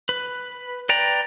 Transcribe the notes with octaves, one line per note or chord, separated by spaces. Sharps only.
B4
B4 D5 G5 A#5